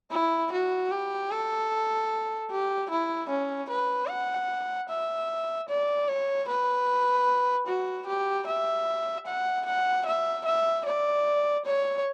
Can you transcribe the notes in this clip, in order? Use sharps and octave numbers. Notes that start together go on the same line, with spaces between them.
E4
F#4
G4
A4
G4
E4
C#4
B4
F#5
E5
D5
C#5
B4
F#4
G4
E5
F#5
F#5
E5
E5
D5
C#5